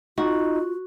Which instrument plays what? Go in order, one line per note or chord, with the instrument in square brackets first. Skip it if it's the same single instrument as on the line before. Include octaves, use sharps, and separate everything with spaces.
[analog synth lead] D#4 [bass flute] F4 [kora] F#4